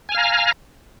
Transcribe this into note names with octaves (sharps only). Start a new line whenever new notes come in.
F5 G#5 A#5 F6